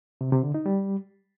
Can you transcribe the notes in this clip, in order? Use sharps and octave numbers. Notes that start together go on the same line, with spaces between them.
C3
C3
D3
D#4
G3